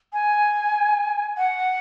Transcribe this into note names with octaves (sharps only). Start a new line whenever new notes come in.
G#5
F#5